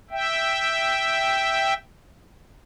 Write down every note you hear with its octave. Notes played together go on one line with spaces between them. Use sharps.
E5 G5